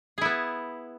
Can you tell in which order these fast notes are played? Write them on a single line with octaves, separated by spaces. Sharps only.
G#4 E4 B3